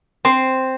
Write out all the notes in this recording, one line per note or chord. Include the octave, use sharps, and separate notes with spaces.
C4 C5